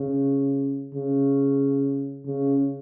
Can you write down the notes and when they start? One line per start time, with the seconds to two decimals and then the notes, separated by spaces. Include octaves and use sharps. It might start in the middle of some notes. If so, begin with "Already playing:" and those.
Already playing: C#3
0.94 C#3
2.26 C#3